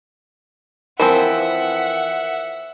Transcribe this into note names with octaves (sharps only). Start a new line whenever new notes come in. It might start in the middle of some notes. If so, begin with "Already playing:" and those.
E3 F3 C4 A#4 E5 F#5